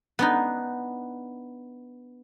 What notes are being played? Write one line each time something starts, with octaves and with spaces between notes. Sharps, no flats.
B3 D4 D#4